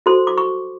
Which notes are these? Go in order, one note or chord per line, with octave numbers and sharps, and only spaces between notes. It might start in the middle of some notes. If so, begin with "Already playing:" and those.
F#4 A4 C5 C6
D6
C#6